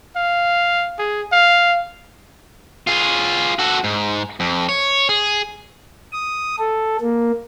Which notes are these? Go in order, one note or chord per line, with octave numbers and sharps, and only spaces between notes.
F5
G#4
F5
F4 G#4
F#4 A4
G#2
F2
C#5
G#4
D#6
A4
A#3